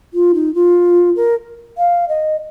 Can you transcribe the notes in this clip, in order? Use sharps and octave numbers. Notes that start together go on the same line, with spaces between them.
F4
D#4
F4
A#4
F5
D#5